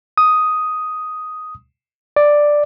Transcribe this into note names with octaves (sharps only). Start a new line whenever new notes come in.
D#6
D5